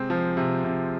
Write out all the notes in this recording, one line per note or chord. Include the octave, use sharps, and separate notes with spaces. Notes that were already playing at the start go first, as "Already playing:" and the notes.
Already playing: C3 G#3 C4
F3
C3
C3